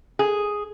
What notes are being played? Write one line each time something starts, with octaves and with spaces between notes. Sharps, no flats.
G#4